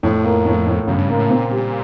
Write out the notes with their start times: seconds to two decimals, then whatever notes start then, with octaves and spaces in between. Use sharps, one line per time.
0.03 F2 A2
0.24 A#3
0.46 A2
0.67 A2
0.87 F#2 C#3
0.98 G2
1.09 G#2 A#3
1.19 A2
1.29 A#2 C4
1.51 G3